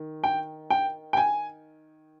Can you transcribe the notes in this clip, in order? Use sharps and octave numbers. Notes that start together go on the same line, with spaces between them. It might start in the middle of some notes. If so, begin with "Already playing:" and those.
Already playing: D#3
G5
G5
G5
G#5